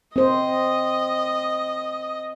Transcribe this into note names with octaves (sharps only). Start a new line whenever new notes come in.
C4 C5 D#5